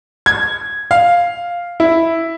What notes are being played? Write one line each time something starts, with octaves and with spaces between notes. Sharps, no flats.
G#6
F5
E4